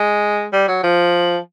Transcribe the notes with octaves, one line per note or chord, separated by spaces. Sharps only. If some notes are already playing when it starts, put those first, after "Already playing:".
Already playing: G#3
G3
F#3
F3